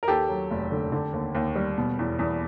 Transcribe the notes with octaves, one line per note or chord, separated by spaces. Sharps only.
A#4
D#2 G4 A4
F#3
F1
D3
D3
D#2
D#2
G3
B2
E2
E2